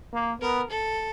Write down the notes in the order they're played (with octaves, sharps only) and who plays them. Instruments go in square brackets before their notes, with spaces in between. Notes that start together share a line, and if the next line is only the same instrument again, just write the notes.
[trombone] A#3
[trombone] B3 [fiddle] A#4
[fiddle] A4